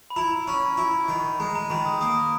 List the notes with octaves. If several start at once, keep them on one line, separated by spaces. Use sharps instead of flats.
B5
E4 A#5
C#4 B5
E4 B5
D#3
G#3 A#5
A#5
D#3 B5
D#6
A#3 D#6